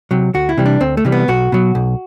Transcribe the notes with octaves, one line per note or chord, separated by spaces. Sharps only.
C3 F#3
D2 F#4
E4
C3 E3 G3
D4
D2 C4
A3
C3 E3 G3
B3
B1 F#4
B2 F#3
B1